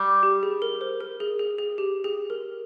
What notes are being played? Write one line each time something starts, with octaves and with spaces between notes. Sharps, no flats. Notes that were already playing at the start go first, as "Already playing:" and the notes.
Already playing: G3
G4
G#4
A#4
C5
A#4
G#4
G#4
G#4
G4
G#4
A#4